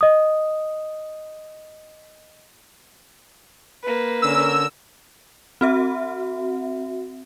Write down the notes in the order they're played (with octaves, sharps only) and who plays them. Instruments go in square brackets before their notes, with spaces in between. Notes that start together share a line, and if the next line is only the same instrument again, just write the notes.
[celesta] D#5 D#6
[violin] A#3 B4
[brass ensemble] D3 C#4 A#4 [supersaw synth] E6
[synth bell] C4 F#4 E5